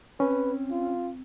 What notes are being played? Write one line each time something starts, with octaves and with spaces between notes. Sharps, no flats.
C4 C#4 B4
F4